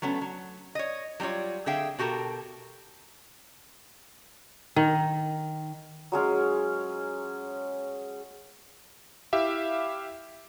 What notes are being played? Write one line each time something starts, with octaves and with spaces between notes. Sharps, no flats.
F#3 A3 B3 C#4
F#3
C#5 D#5
F#3 G3 D#4 F4 C#5
D3 C4 G#4 E5 F5 G5
B2 F#4 G4 A4 A#4
D#3
F#3 G#3 C#4 F5
E4 G4 E5 F5